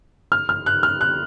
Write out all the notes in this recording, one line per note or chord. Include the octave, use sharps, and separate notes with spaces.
F6
F6
F#6
F6
F#6